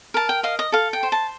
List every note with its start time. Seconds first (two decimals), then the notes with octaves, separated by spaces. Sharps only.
0.14 A#4 A5
0.29 G5
0.43 D#5 F5
0.59 D#5
0.72 A4 F5
0.93 G5
1.03 C5
1.12 A5